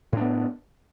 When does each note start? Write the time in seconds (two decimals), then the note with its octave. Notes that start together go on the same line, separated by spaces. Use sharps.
0.12 A2
0.17 D4
0.21 B3